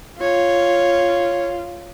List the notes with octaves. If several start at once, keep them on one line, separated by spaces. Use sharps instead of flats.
F4 C#5